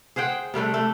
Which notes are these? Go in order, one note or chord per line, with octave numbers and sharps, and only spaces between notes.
G#4 C5 F#5 G5
C3 G3 A3 D4
A3